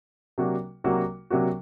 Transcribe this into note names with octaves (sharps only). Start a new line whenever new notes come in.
C3 F#3 A#3 D4 F#4
C3 F#3 A#3 D4 F#4
C3 F#3 A#3 D4 F#4